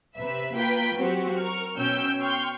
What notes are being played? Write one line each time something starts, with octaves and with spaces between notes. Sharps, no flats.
C3 B4 E5
A#3 F4 A#4 B4 G5 B6
F#3 C4 F#4 G4
A#4 C#6 F6
B2 C#4 G5 E6 G6
G5 C6 C#6 F6 G6